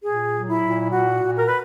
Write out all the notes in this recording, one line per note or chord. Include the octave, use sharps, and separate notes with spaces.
A#2 G#4
F#3
E4
A#2
A#2 F#4
A#2
A#4
B4